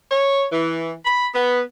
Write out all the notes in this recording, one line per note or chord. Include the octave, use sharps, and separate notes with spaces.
C#5
E3
B5
B3